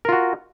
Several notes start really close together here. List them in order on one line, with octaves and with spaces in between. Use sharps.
A#4 F4 F#4